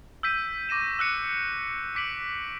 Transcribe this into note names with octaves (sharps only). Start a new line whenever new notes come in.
E6 G6 B6 D#7
C#6 D6 A#6 D#7 E7
E6 F#6 C#7 D#7
D6 B6 D7 F#7